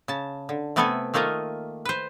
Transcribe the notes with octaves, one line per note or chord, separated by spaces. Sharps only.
C#3 A5
D3
C3 A3 B3 A4 E5 G#5
D#3 A3 A#3 F4 D#5
B4 C5